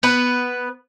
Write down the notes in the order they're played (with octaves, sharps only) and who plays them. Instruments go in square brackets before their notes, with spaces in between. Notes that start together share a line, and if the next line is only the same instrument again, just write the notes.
[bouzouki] B3 B4